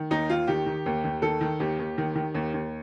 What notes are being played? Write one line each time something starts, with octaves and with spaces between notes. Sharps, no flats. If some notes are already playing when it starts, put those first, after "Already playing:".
Already playing: D#3
D#2 D#4
D#2 F4
D#3 G4
D#3
D#2
D#2
D#3 A4
D#3
D#2 G4
D#2
D#3
D#3
D#2
D#2